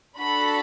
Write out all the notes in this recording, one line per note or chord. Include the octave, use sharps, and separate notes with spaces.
D4 F#4 A4 B5